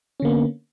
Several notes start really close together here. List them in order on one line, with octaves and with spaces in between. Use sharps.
C#4 D3 A#3 B3